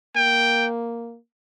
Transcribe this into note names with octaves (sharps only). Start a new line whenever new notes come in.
A#3 G5